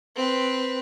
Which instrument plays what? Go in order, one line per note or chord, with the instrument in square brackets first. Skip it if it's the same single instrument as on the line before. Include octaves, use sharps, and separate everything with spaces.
[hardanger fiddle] C4 B4